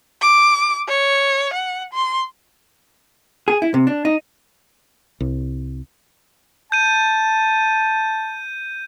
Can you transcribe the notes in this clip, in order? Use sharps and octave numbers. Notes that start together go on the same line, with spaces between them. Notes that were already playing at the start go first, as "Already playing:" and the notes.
D6
C#5
F#5
C6
G#4
E4
C3
D4
D#4
C2
A5 G6 D#7